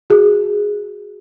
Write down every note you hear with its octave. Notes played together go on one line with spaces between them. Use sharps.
F#4 G#4